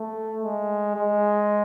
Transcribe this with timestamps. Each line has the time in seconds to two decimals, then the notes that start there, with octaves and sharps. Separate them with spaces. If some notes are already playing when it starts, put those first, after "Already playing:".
Already playing: A3
0.44 G#3
0.95 G#3